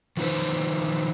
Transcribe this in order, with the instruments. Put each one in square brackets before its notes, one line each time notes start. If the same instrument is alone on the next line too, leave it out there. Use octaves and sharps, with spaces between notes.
[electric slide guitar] D#3 F3 D#4 B4 C5